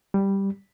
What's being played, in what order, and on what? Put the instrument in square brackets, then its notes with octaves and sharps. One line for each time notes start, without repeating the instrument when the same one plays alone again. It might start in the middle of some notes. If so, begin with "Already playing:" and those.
[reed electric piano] G3